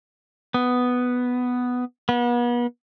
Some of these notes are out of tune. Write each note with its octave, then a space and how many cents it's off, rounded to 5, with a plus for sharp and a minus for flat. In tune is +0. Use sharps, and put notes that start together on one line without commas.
B3 +5
B3 -40